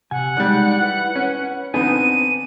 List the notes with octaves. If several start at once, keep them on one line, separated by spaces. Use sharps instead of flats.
C3 F#5 G#5
G3 G#3 D#4 D5 F#6
E4 B4
C#4 B4
D3 B3 C4 D#4 G#5 D#7